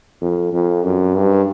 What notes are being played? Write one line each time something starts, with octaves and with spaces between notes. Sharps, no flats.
F2
F2
F#2
G2